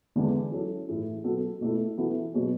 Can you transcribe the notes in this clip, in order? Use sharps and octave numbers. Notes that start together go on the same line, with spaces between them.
E2 D3 G#3 B3 D4
F#3 C#4 E4 A4
A2 E3 A3 E4 G#4
B2 F#3 B3 F#4 A4
B2 A3 E4 A4
E3 B3 F#4 A4
B2 F#3 C#4 G#4